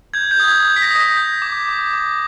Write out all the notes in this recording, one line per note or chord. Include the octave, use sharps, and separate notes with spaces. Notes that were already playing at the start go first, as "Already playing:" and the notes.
G6 G#6
G6
D#6
G#6
G6
B6
A#6
D#6
B6
G6
D6
D6
D6